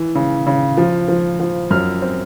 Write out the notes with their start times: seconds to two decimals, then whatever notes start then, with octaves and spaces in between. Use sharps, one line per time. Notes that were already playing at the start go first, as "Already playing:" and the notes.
Already playing: E3
0.15 C#3
0.47 C#3
0.77 F3
1.08 F3
1.40 F3
1.70 F#2 F6
2.02 C4